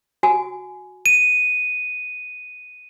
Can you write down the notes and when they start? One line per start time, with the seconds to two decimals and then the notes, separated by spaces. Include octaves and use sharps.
0.23 F#4 G#5
1.06 D#7